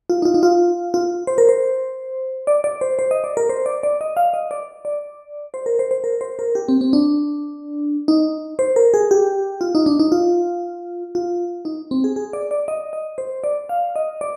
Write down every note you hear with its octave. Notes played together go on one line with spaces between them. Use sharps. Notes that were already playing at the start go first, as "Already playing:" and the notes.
F4
D#4
F4
D#4
F4
F4
C5
A#4
C5
D5
D5
C5
C5
D#5
D5
A#4
C5
D5
D5
D#5
F5
D#5
D5
D5
C5
A#4
C5
C5
A#4
C5
A#4
G4
C4
C4
D4
D#4
C5
A#4
G#4
G4
F4
D#4
D4
D#4
F4
F4
D#4
C4
G#4
G#4
D5
D5
D#5
D#5
C5
D5
F5
D#5
D5